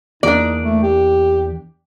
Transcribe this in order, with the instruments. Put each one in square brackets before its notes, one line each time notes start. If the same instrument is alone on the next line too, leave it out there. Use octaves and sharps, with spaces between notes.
[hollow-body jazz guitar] E2 A#3 [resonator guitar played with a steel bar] D4 D5 [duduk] D#4
[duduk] A3
G4